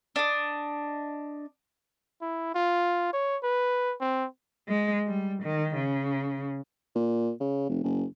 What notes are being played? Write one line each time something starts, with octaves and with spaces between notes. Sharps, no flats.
D4 D#5
E4
F4
C#5
B4
C4
G#3
G3
D#3
C#3
A#2
C#3
F1
F#1